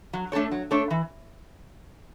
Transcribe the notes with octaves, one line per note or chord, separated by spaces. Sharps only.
F#3
A3 D4 A4 C#5
F#3
A3 D4 A4 C#5
E3